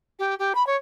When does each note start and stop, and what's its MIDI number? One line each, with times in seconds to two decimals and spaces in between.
0.19 0.35 67
0.39 0.53 67
0.55 0.65 83
0.66 0.76 73